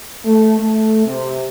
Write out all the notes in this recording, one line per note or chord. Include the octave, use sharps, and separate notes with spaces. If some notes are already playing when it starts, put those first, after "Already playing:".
A3
A3
C3